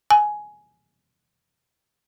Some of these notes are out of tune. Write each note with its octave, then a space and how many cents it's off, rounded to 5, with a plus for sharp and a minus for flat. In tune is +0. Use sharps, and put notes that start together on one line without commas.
G#5 +10